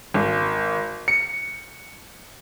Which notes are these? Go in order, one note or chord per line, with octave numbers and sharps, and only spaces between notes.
G#1
C#7